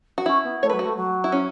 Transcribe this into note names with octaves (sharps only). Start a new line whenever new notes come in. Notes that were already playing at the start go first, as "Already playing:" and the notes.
F#4
C#4 E4
B3
A3 C#5
F#3 B4
F#4
A3
F#3
E4
C#4